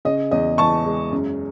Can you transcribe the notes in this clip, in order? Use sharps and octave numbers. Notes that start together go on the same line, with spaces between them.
C#3 D#5
E2 D#5
E3 A5 C#6
G#3
F#2